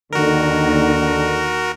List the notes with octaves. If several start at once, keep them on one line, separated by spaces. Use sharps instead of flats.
D#2 D3 D#3 F#4 A#4